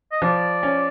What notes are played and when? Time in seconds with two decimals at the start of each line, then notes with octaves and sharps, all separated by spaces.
0.11 D#5
0.22 F3 D5
0.63 C#4